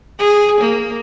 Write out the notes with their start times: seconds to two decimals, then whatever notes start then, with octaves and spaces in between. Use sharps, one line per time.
0.19 G#4
0.60 A#3